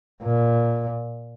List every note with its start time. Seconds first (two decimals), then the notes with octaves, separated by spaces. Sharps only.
0.24 A#2